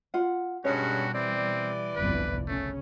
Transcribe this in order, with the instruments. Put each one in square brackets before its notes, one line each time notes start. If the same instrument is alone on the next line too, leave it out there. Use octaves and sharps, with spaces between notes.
[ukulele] F4 F#5
[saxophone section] G2 G#3 C#4 [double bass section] B2 G3 [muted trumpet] F#4 [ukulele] C#5
[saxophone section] E3 D5 [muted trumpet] C4
[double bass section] G1 C2 F2 [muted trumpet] B4
[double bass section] C#3 C#4 [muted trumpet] A3